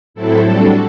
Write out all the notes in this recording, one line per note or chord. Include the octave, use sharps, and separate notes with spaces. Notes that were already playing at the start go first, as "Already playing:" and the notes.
A2 F#3 C4 E4 A4
G3 D4 F#4 A4